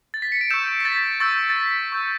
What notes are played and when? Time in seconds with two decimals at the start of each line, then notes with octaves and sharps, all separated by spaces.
0.14 A6
0.22 B6
0.32 C#7
0.41 D7
0.51 C#6 E6 G6 E7
0.80 B6
0.85 A6
1.20 C#6 E6 G6 A6
1.50 A6
1.56 B6
1.92 C#6 E6 G6